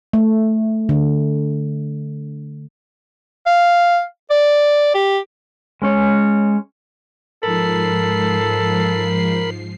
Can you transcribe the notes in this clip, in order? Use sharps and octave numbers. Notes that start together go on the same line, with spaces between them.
A3
D3
F5
D5
G4
G#3 C#4 C#5
G#2 F3 A4 A#4 B5 C7